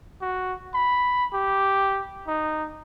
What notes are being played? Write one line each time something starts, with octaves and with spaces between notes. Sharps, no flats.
F#4
B5
G4
D#4